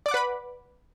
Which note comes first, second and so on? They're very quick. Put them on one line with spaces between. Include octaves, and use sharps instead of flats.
D5 D6 F#5 B4 B5